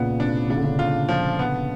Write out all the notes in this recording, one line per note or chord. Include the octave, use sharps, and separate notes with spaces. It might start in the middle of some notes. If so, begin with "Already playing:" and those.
Already playing: A#2 C#3 B3
C3 D4
C#3 D4
D3
C#3
F4
F3
B3